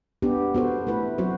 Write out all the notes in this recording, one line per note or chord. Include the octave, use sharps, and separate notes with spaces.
B3 D4 G4
B3 F#4 A4 C5
A3 E4 B4
F#3 C4 F#4 C5